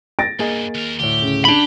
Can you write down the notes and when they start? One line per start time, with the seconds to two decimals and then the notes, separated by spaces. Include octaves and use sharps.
0.19 A6 A#6 D7
0.39 E2 G2 A#3 G#4 D#5
0.75 D#2 A#4
1.00 D2 A2 G4
1.22 C#3
1.45 D4 G4 B5